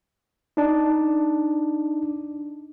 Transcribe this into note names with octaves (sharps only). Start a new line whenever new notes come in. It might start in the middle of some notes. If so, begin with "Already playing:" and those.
D4 D#4